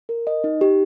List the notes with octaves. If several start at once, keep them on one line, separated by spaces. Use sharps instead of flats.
A#4
D#5
D#4
G4